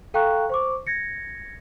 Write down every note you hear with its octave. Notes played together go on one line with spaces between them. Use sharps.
A4 F5 G5 A#5 C#6 F#6
C5 C#6 D6
G#6 A#6 C#7